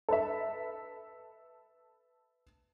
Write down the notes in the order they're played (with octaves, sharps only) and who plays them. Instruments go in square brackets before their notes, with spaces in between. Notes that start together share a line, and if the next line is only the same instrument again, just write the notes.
[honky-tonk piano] A4 B4 E5